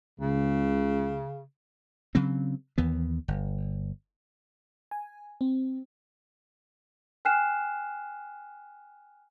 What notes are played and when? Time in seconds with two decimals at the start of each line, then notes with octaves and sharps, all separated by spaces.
0.20 C#2 C#3
2.15 C#3 F#3 C4
2.78 D#2 E3 B3
3.28 G1
4.91 G#5
5.41 C4
7.25 G5 G#5 F6 F#6 C7 E7